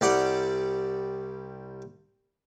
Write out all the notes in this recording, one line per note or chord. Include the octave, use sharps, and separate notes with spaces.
C2 G3 D5 F#5